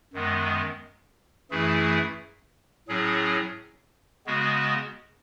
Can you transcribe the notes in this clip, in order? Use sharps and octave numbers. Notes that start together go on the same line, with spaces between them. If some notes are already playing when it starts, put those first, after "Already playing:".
F#2 D#3 G#3 B3
F#2 E3 A3 E4 G#4
A2 F#3 C#4 G#4
C#3 G#3 B3 F#4